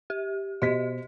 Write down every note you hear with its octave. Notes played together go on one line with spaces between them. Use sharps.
G4
B2 G4 C5 D#5 B6